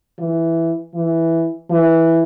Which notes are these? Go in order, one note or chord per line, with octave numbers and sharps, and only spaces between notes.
E3
E3
E3